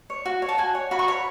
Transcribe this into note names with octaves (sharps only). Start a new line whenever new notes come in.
C#5
F#4
C#5
A5
F#4 G#5
C#5
F#4 B5
C#6
C#5 B5